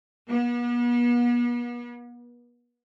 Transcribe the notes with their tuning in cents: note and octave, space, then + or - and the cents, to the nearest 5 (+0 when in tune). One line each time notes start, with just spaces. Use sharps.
B3 -40